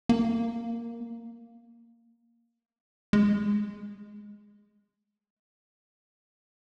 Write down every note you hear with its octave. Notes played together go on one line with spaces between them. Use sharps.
A#3
G#3